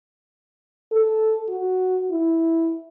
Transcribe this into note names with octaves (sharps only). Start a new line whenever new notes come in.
A4
F#4
E4